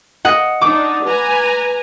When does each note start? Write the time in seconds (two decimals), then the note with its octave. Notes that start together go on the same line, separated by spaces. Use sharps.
0.25 D#5 F#5
0.62 D4 D#4 D6
1.05 B4 G#5 A#5